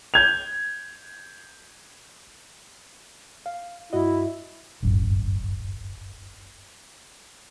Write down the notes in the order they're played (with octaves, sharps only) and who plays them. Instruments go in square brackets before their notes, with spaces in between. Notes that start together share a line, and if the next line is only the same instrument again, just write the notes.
[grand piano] G6 G#6 F7
[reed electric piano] F5
[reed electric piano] G2 F#4 D#5 [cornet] E4
[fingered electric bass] D1 G1 F#2